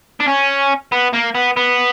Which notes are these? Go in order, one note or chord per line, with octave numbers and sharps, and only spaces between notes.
D4
C#4
B3
A#3
B3
B3